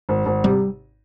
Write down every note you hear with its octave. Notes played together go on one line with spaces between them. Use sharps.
G#1
G#1
C3 G3